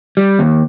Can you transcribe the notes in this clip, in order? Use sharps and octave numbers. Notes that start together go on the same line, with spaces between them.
G3
D#2